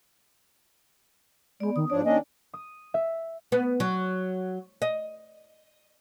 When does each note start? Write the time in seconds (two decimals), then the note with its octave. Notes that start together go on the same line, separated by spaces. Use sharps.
1.60 G#3 B3 D5
1.76 D#3 D#6
1.90 G#2 F3 D4 C#5 D5
2.04 D#3 A#3 C#4 D4 D#5
2.54 D#6
2.94 E5
3.52 B3
3.80 F#3
4.82 D#5